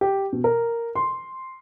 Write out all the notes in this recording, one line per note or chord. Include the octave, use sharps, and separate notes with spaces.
G4
B2
A#4
C6